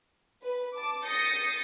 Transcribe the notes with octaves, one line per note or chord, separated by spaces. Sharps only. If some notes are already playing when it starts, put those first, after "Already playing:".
B4
A5 D6
D#6 G6 A6 A#6 C7 C#7